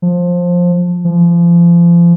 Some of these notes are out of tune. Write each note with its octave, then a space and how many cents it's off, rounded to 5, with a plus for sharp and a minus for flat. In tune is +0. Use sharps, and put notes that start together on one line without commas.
F3 +15
F3 -30